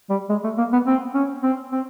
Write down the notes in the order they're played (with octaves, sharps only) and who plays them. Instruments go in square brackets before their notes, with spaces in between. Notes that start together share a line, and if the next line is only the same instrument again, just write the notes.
[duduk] G3
G#3
A3
A#3
B3
C4
C#4
C4
C4